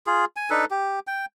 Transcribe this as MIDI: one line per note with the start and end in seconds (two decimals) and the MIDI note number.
0.07 0.25 65
0.07 0.25 68
0.36 0.50 80
0.50 0.65 62
0.50 0.65 63
0.50 0.65 69
0.50 0.65 71
0.71 1.00 67
1.07 1.26 79